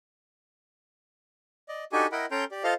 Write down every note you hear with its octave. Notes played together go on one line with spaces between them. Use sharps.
D5 D#5
D4 D#4 F#4 G4 A4 G#5
E4 A#4 D#5 F#5 G5 B5
C#4 A4 G5 A#5 C6 G6
G4 D5
F4 A4 C5 D#5 F5